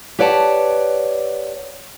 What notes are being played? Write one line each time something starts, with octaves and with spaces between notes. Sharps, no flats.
G4 B4 C#5 D5 F#5 A5